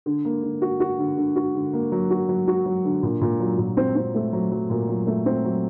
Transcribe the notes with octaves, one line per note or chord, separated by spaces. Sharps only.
D3
A#3
D3
F#4
F#4
D3
D3
F#4
D3
A#3
F#3
F#4
F#3
F#4
F#3
D3
A#2
A#2
F#3
A#2
C4
C4
A3
F#3
F#3
A#2
F#3
A3
C4
F#3